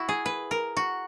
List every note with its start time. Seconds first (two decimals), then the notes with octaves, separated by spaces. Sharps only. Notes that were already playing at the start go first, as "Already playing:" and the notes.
Already playing: E4 F#4
0.09 G#4
0.26 B4
0.51 A#4
0.77 F#4